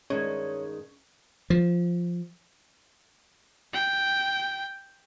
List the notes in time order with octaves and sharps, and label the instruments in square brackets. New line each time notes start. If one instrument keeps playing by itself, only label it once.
[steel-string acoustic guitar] G2 D#3 G#3 [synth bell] C#4 [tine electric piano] C#5
[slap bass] F3
[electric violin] G5